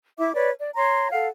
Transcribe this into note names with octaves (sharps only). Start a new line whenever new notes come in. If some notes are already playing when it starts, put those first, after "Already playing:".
E4 E5 D6
B4 C#5 D5
D5
C#5 A#5 C6
A4 F5 F#5